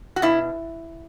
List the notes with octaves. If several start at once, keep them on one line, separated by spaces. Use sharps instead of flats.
F#4
B2 E4